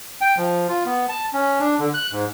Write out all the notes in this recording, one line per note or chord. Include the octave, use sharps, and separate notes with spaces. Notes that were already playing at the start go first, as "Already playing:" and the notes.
G5
F3
F4
B3
A5
C#4
D4
D3
F#6
G#2